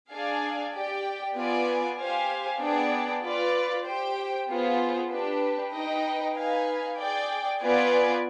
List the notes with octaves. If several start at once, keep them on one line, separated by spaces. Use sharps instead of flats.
D4 G#4 D5 F5 G#5
G4 D5 G5
B3 F4 B4 D5 G#5
G4 C5 F5 G#5
B3 D4 G#4 D5 G5
F4 B4 D5
G4 C5 G5
B3 F4 G#4 C5
D4 G4 B4
D#4 B4 D#5 G5
D#4 B4 F5 G#5
G#4 D5 G5
B3 F4 B4 D5 G#5